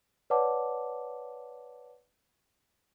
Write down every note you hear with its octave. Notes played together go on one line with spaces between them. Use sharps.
B4 C#5 D5 F#5 A5 D6